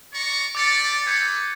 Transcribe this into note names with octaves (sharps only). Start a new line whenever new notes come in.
D5 A#5 C#6
G4 A4 D5 D6 A6 C#7
G#4 A4 B4 G6 G#6 C#7